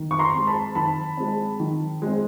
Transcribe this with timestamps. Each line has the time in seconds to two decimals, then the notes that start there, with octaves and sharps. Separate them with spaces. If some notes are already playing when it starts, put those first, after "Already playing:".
Already playing: D#3
0.11 C#6
0.19 A#5 C6
0.33 G#3 C4
0.47 A5 B5
0.75 D#3 A5 B5
1.17 G#3 C4
1.60 D#3
2.02 G#3 C4